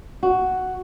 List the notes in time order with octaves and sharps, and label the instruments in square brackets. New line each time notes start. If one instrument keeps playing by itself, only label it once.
[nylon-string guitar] F#4